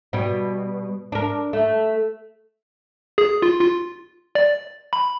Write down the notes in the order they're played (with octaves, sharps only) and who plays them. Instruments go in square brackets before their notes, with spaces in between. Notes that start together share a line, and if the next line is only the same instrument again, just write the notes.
[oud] B2 G3
D4 A#4
A3
[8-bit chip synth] G#4
F4
F4
D5
B5